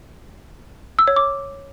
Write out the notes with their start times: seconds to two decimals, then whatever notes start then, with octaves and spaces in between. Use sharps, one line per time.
0.99 E6
1.08 C#5
1.16 D6